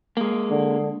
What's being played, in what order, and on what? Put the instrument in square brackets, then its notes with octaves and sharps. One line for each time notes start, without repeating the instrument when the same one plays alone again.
[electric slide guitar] G#3 A#3
[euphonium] D3